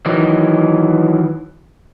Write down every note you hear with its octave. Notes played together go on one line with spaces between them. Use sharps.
D#3 E3 F#3